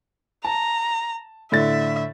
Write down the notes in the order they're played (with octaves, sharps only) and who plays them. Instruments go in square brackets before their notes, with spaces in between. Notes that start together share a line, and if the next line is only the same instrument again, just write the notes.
[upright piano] A5 [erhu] A#5
[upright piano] A2 D3 A6 [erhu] E5